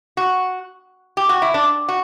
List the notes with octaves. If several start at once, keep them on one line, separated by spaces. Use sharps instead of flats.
F#4
G4
F#4
E4
D4
F#4